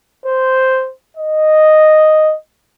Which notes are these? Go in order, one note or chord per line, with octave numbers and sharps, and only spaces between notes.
C5
D#5